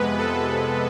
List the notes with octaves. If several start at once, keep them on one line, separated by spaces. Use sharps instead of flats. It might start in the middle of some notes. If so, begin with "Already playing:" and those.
Already playing: F2 C3 G#3 B3 B4
A4